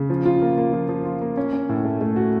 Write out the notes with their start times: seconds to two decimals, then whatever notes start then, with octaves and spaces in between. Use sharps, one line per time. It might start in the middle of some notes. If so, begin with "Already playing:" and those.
Already playing: C#3
0.10 F3
0.25 F4
0.42 A#3
0.58 A#3
0.73 F3
0.89 F3
1.05 F4
1.22 A#3
1.37 C#4
1.53 C#4
1.69 A2
1.85 A3
2.01 A3
2.16 F#4